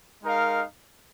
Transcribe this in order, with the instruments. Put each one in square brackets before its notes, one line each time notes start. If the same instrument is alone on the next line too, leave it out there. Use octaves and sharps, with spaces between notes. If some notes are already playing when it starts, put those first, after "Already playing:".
[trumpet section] G#3 D#4 A#4 F5